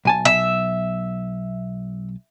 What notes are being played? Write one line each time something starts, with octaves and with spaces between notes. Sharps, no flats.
B1 G#5 A5
E5